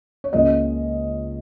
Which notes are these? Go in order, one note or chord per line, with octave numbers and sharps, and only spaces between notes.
C#5
C#2 C#3 A#3 C#4 D#5